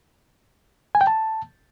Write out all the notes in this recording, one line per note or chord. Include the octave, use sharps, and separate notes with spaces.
G#5
G5
A5